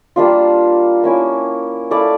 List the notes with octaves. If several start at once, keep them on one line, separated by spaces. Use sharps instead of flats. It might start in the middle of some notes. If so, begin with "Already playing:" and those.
G3 A#3 D4 F4
A#3 C#4 E4 A#4
E4 A4 D5 F5